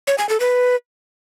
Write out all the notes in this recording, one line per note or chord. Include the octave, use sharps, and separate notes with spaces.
C#5
G#5
A4
B4